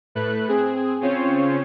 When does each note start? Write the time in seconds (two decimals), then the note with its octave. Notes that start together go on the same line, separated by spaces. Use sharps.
0.15 A2 A3 B4 F#6
0.48 C4 G#4
1.01 C#3 C4 C#4 F4 C5 C#5